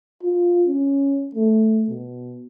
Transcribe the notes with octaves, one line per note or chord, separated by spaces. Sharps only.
F4
C#4
A3
B2